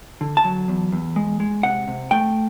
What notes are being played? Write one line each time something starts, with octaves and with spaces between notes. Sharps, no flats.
D3
A5
F#3
E2
E2
G#3
G#3
C3 F#5
C3
A3 G5